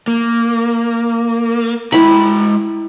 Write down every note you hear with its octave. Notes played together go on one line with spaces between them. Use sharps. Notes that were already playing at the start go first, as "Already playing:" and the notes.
A#3
G#3 E4 G5 A#5 B5